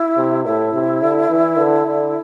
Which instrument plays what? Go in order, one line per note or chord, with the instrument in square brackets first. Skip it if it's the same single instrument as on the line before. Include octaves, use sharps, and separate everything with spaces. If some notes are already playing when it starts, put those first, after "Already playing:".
Already playing: [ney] E4
[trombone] C3
[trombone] A2 [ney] E4
[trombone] C3
D3
E3
D3
D3